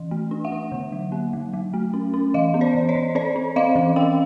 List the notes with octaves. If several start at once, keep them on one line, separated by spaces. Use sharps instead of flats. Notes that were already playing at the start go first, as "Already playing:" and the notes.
Already playing: E3
A3
D4
E5 F#5
D4
D3
F#3
A#3
F#3
F#3
A3
C#4
C#4
E3 D#5 F5
B3
C5 D5
E3
C#5 D#5
E3
C4 C5 D5
C4
C4 D#5 F5
E3
C#4 F5 G5